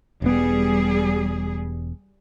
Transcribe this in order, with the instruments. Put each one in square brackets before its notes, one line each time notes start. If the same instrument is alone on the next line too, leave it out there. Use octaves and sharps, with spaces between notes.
[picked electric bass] E1 B3 [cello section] G3 G#4